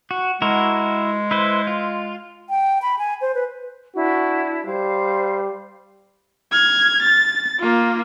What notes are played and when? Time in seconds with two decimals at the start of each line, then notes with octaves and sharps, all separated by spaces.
0.11 F#4
0.42 G#3 E4 F#4 A#4
1.31 E4 B4 C5
1.67 F4
2.50 G5
2.82 B5
2.99 G#5
3.21 C5
3.35 B4
3.95 D4 E4 F#4
4.65 G3 C5 F5
6.52 F6 G#6
7.02 A6
7.59 A#3 F4